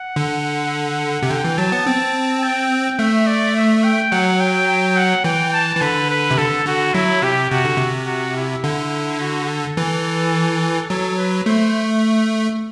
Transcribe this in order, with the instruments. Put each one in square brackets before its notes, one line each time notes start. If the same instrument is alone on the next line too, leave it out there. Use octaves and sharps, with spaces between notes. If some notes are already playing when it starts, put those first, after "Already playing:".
Already playing: [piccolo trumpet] F#5
[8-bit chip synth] D3
C3
[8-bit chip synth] D3 [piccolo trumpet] G5
[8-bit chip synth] E3
[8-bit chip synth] F#3 [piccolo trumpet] A5
[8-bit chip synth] B3
C4
[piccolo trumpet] G5
[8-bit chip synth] A3 [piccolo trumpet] E5
[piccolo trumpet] D5
E5
G5
[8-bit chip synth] F#3 [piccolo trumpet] F#5
[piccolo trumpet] G5
G5
F#5
[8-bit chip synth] E3 [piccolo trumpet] G5
[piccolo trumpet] A5
[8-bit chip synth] E3
[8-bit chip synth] D3 [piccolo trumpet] B4
[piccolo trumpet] B4
[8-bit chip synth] C3
[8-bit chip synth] D3 [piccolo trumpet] A4
[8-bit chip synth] D3 [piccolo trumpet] F#4
[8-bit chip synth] F#3 [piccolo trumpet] E4
[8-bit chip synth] C3 [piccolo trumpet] G4
[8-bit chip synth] C3 [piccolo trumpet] F#4
[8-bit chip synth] D3
C3
[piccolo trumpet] F#4
E4
[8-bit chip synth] D3
[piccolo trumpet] F#4
A4
[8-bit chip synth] E3
[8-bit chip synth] F#3 [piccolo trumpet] A4
[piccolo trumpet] B4
[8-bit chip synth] A3 [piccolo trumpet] C5